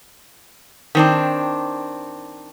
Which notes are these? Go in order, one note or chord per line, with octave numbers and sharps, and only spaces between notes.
D#3 C4 D4